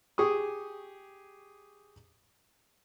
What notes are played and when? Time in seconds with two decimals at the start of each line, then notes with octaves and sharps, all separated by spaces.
0.18 G4 G#4 C#6 D#6